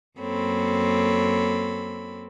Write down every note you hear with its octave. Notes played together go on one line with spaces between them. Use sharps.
F#2 A#3 C4 A4 C#5 B5